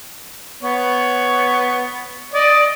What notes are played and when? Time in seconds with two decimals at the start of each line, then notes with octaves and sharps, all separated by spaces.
0.63 B3 C#5
2.34 D5 D#5